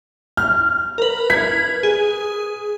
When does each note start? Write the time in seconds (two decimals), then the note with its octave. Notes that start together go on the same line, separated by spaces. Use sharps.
0.37 F6
0.98 A#4 B4
1.30 G#6 B6
1.83 G#4